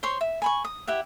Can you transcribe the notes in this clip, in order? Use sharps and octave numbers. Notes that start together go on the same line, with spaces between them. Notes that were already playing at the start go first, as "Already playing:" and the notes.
C5 C#5 C6 C#6
E5
G#5 B5 C#6
D#6
E4 G4 E5 F#5